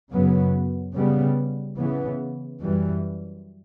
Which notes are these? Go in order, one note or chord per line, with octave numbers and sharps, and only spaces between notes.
F#2 C#3 F#3 B3
C#3 G3 B3
C#3 E3 B3
F#2 E3 G3